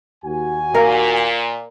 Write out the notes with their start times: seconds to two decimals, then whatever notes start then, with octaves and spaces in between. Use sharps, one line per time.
0.24 D#2 F#4 G#5
0.74 A#2 A#4 F5